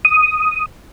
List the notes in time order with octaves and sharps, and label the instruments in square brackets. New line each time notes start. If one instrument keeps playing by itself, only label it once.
[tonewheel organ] D#6